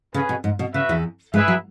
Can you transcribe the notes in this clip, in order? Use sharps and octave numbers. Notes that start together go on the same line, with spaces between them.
C#3 C#4 G#4 B4
B2
G#2
B2
C#3 F#4 B4 E5
E2 E3
G#2 G#3 E4 G#4 B4 E5
F#3